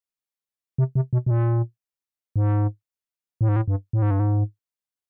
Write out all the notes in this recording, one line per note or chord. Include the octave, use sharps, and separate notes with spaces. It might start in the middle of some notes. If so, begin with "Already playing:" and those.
C3
C3
B2
B2
A#2
G#2
A2
G#2
A2
G2
A2
G#2
G2
G#2